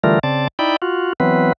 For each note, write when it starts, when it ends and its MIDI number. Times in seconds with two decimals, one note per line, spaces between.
0.04 0.19 50
0.04 0.19 52
0.04 0.19 55
0.04 0.19 57
0.04 0.19 65
0.04 0.19 70
0.23 0.48 49
0.23 0.48 60
0.23 0.48 74
0.23 0.48 81
0.59 0.76 63
0.59 0.76 64
0.59 0.76 74
0.59 0.76 79
0.59 0.76 83
0.82 1.13 65
0.82 1.13 66
1.20 1.52 52
1.20 1.52 54
1.20 1.52 59
1.20 1.52 60
1.20 1.52 71